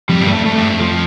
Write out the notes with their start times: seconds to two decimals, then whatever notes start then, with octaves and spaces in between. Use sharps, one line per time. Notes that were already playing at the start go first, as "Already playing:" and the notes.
0.09 F2 G3
0.21 G2
0.27 A3
0.34 F2
0.45 F2 A3
0.57 G2
0.69 F2
0.81 F3